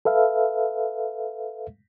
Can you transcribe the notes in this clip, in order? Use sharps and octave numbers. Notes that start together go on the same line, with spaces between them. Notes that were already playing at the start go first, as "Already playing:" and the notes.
A4 B4 E5 F5